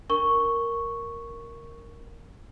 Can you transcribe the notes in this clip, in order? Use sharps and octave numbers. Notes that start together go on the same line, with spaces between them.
D4 A#4 C#6 G7